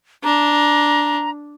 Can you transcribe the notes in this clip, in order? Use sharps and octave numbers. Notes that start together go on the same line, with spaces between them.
D4 A#5